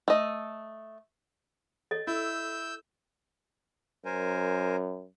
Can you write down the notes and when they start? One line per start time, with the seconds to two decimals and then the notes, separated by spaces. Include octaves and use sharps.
0.08 A3 D#5
1.91 A4 C#5 D#5
2.07 E4 E6 G6
4.05 F#2 A#4 C5 G#5